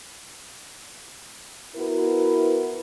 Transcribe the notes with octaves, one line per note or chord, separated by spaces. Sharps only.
B3 E4 F#4 A#4 B4